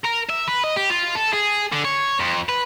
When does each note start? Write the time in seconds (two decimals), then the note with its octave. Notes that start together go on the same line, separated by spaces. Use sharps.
0.04 A#4
0.29 E5
0.48 B4
0.64 D#5
0.76 G4
0.90 F4
1.15 A4
1.33 G#4
1.72 D3
1.85 C#5
2.20 F2
2.49 B4